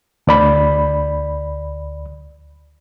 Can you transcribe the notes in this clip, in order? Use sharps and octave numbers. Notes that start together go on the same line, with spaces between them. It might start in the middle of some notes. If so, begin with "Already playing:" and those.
D2 D5 B5